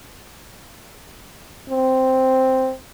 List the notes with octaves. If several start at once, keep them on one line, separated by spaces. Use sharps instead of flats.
C4